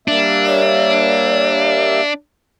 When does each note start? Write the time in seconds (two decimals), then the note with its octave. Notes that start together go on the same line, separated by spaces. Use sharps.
0.08 G3 A#3 D4 E5
0.46 C#5